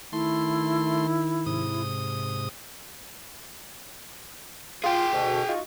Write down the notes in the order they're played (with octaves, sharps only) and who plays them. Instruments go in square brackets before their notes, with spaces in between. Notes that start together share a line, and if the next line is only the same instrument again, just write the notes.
[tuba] D#3 [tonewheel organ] A3 C6 [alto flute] E4
[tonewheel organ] G#2 C3 D#6
[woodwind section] F4 [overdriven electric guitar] G#4 G5
[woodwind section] D2 B2
D#4 F4 F#4